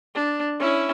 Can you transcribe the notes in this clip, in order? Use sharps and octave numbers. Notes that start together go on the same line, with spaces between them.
D4
C#4 E4